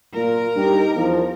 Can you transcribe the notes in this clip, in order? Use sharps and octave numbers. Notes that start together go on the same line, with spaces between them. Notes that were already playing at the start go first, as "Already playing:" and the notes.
A#2 F4 A#4
G2 D#4 G4
E2 F3